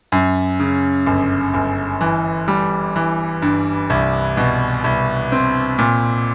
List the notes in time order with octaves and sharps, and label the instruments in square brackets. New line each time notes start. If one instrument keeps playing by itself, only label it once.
[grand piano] F#2
C#3
G1
G1
E3
G3
E3
G2
C2
B2
C2
C4
A#2